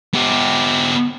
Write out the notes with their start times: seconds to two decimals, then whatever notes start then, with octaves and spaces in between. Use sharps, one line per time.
0.13 B3 G4